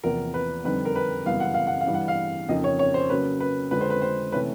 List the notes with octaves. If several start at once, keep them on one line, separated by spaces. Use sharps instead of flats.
E2 C3 F3 A#3 A#4
B4
F2 D3 G3 C4 D#4 B4
A#4
B4
F#2 C#3 E3 G3 B3 F5
F#5
F5
F#5
F5
G2 E3 G3
F#5
F5
F2 C#3 F3 A#3 D#4 D#5
C#5
C#5
C5
C#3 F#3 A#3 C#4 B4
B4
F2 D3 F3 G#3 C4 B4
C5
B4
C5
C3 E3 A3 C#4 B4